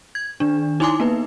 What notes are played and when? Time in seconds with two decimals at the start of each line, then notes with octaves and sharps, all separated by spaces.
0.15 G#6
0.40 D#3 D4
0.80 D#4 E4 G#5 C6 D6
1.00 A#3 B3 D#4 B4